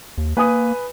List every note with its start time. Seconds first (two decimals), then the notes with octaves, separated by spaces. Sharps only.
0.18 D#2
0.37 A#3 B4 G#5 D#6